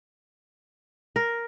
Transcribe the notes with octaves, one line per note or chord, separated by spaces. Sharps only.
A#4